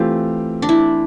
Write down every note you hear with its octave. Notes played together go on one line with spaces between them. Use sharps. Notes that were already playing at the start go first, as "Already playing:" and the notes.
Already playing: E3 A3 C4 F4 G4
D4
E4